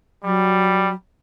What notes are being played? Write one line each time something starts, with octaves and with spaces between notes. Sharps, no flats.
F#3 G3